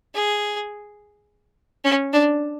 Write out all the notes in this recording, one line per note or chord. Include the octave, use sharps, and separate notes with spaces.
G#4
C#4
D4